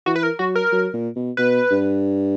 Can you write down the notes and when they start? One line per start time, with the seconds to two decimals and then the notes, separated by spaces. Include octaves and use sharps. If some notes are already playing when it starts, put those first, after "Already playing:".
0.06 E3 F#4
0.16 B4
0.23 A#4
0.39 F#3 F#4
0.56 A#4
0.72 F#3
0.94 A#2
1.16 B2
1.37 B2 B4
1.71 G2